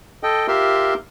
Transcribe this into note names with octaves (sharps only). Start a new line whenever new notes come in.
A4 D#5 G5
F4 G4 A#4 E5 C6